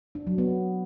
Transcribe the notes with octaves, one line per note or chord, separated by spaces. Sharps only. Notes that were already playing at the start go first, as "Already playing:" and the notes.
D4
F#3
B3